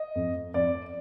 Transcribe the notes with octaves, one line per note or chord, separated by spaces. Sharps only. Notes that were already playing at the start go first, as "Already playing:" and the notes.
Already playing: D#5
F2
F2 D5